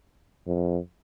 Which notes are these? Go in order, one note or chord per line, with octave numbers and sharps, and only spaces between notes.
F2